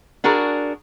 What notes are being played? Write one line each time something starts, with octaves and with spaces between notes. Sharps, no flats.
D4 F#4 G#4 A#4